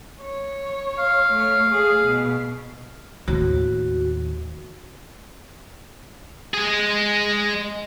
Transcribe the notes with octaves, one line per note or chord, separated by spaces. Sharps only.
C#5
F5
A3 C#5
A3 G#4
B2
D#2 A2 F#4
G#3 G#4